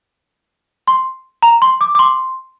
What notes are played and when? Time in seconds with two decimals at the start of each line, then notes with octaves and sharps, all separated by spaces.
0.87 C6
1.43 A#5
1.62 C6
1.81 D6
1.95 D6
1.99 C6